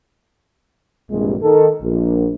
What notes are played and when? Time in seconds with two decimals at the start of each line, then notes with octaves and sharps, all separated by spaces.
1.09 A#1 E2 G2 C3 G#3
1.41 D#3 A4
1.81 A#1